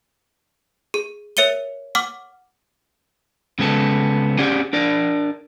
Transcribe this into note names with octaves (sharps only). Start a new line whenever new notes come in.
G#4
A#4 C#5 E5 C#7 D#7 G7
F#5 C#6 D6 F6
C#3 G#3 B3 A4
C#4 G4 G#4 D5 F#5
D4 A#4 D5